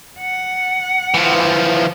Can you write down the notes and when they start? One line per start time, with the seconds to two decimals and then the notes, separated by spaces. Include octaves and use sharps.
0.21 F#5
1.14 E3 F3